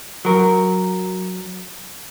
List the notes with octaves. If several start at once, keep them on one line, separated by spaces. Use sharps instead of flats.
F#3 A#4